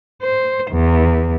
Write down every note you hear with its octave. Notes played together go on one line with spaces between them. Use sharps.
C5
E2